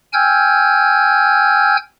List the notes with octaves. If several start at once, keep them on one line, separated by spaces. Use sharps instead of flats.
G5 G#5 E6 F6 G6 G#6